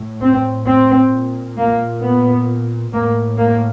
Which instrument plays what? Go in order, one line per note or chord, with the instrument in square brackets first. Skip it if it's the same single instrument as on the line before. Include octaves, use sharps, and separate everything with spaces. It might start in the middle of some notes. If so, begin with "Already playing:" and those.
Already playing: [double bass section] A2
C4
C4
A#2
A#3
B3
A2 A#3
A#3